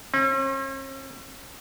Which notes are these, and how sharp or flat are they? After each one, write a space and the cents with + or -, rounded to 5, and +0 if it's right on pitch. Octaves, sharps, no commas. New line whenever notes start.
C#4 -45